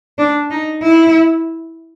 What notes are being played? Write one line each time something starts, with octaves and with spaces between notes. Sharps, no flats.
D4
D#4
E4